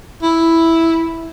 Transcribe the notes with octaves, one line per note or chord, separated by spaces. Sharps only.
E4